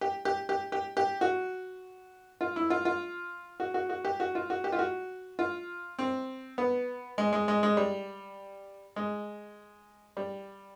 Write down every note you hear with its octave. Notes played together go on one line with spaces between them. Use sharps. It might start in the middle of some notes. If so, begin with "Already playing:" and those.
G4
G4
G4
G4
G4
F#4
F4
E4
F4
F4
F#4
F#4
F#4
G4
F#4
F4
F#4
G4
F4
F#4
F4
C4
B3
G#3
G#3
G#3
G#3
G3
G#3
G3